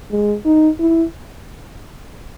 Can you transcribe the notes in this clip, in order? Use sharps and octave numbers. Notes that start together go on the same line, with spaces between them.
G#3
D#4
E4